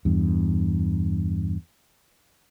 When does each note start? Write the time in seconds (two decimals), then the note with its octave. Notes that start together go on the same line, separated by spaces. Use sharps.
0.05 E2 G2